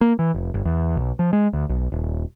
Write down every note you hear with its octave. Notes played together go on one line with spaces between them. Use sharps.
A#3
E3
F1
G1
E2
B1
F3
G#3
D2
B1
D#1